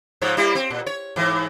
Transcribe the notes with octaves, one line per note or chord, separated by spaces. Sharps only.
G#2 F3 C#5
G3 A#3 E4
C4
A#2
C#5
G#2 E3